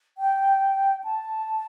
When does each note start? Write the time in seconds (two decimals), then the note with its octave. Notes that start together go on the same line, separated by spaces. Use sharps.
0.18 G5
1.04 A5